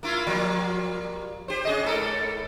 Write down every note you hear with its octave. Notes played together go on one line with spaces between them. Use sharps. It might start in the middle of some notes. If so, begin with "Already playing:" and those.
A#3 E4 F4
F3 G3 A#3
G4 C5
C#4 G#4 D#5
G#2 A4 A#4